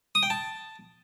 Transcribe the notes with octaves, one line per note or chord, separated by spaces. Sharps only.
D#6
G5
A5